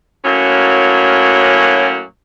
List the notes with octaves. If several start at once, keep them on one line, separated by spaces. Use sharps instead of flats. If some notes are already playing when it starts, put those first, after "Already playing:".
F#2 A2 F#3 A#3 C#4